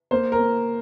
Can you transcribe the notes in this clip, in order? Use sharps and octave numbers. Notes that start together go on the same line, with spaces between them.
A#3 C5
A#4
A#3